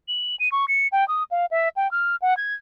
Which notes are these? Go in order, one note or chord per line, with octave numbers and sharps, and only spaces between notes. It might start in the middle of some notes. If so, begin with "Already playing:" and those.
F#7
D#7
C#6
C#7
G5
D#6
F5
E5
G5
F6
F#5
G#6